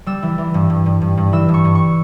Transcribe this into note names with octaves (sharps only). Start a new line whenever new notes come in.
G3 E6
E3
E3
G2
G2
G2
G2
G2
E3 E6
G2
C#6
G2
C#6